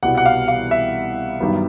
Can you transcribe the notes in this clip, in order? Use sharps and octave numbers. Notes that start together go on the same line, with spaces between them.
C2 B2 G3 B3 F#5
F#5
F5
F5
E5
G2 D#3 F#3 B3